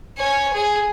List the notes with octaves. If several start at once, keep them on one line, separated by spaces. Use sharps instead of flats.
C#5 G#5
G#4